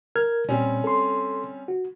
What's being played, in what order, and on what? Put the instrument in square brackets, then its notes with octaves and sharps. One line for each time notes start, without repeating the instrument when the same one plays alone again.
[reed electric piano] A#4 F6 G#6
[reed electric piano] A#2 [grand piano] G3 C4 C#4
[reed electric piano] A4 C6
F#4